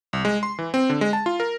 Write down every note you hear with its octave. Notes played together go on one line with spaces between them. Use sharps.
C2
G#3
C6
E3
C4
D3
G#3
A5
F4
A#4